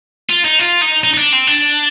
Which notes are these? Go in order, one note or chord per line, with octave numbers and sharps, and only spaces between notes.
F4
D#4
F4
D#4
D#4
D#4
D4
C4
D4